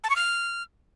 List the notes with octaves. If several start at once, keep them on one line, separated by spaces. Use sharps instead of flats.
A5
C#6
F6